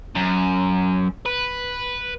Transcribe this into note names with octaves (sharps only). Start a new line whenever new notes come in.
F#2
B4